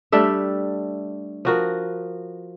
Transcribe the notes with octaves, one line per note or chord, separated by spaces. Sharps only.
G3 A3 D4 E5
F3 F#4 A#4